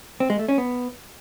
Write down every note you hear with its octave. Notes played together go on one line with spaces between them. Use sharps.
C4
G#3
A3
C#4
B3